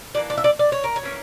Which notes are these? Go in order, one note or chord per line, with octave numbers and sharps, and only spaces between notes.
E3 A#3 D4 D5
D5
E5
D5
D5
C#5
A#4
C#5
E3 A#3 C#4